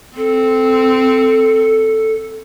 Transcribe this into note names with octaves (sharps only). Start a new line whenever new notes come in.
C4 A4